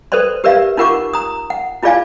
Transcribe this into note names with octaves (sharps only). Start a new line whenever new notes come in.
A4 B4 C5 D5 C6
G4 A#4 B4 D5 E5 F5
D#4 F4 A#4 F#5 C#6 D6
A#5 D#6
F#5
E4 F4 G#4 D5 F5 G#5